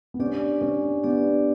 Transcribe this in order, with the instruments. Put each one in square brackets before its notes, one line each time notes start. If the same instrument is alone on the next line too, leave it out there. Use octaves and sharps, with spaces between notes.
[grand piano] B3
[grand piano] C#4 [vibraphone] D4 G4 D5
[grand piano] C#4
[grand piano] B3 [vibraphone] D4 G4 D5